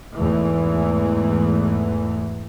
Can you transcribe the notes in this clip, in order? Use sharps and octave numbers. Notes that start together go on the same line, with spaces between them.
E2 G#2 E3 A3